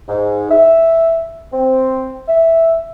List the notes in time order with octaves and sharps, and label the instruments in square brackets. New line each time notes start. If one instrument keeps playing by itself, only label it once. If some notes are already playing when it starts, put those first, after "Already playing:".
[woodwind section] G#2
E5
C4
E5